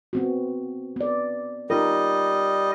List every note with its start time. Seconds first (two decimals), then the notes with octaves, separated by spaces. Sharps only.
0.13 B3 C4 F#4
0.96 B3 D5
1.70 G3 D#4 F4 A#4 D#5